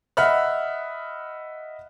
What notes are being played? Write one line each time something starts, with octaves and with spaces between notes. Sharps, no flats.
D#5 E5 F#5 B5 F6 F#6